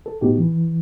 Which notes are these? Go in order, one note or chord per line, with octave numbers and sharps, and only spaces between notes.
A4
A2 B3 D#4 F#4 G4
E3